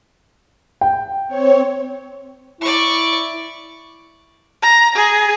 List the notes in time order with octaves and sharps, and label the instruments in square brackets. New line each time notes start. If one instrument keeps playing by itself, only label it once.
[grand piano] G5
[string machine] C4 C#5
[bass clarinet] E4 [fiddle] D5 C#6
[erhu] A#5
G#4